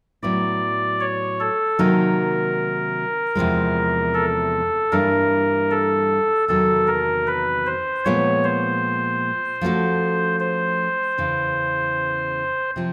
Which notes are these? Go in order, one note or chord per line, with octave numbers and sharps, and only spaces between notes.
A2 F#3 B3 E4 D5
C#5
A4
C3 D#3 F#3 A#3 D#4 A#4
E2 C3 F3 G#3
A4
G2 E3 G3 A#3 D4 A#4
A4
E2 C3 D#3 F#3 A4
A#4
B4
C5
A#2 F3 G#3 B3 C#5
C5
F3 A3 C#4 F#4 A4
C5
E2 C#3 E3
C3 F3